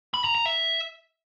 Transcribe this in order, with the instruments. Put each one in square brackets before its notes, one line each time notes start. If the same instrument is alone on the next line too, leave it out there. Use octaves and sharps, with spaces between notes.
[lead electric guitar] B5
A#5
A#5
E5